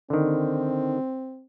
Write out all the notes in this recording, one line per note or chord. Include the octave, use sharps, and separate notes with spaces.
D3 D#3 C4